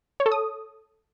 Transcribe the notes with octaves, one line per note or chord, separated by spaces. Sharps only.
C#5
A4
D#6